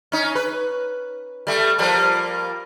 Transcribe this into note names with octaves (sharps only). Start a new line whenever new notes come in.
C#4 D#4
B4
G3 A3
F3 G3 A#3